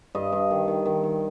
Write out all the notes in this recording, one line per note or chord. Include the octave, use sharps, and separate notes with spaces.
G2 D#5
G2
D#3
D#3
D#3
D#3